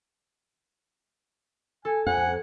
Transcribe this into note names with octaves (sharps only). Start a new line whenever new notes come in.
A4 G#5
F2 F#5 G#5